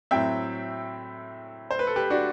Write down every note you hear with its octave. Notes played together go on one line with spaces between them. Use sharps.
A2 F#3 C4 E5 G5
C5
B4
A4
G4 B4
D4 F#4